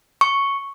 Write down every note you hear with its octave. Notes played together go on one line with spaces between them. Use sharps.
C#6